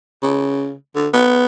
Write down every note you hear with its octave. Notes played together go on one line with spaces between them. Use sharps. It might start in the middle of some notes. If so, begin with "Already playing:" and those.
C#3
D3
B3